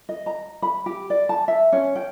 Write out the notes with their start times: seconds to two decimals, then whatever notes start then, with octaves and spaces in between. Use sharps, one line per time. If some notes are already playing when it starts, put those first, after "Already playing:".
0.09 D#5
0.26 A#5
0.62 B5
0.86 G4
1.10 D5
1.29 A5
1.48 E5
1.72 C#4
1.95 G5